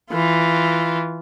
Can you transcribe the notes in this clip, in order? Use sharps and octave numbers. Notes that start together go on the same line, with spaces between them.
E3 F4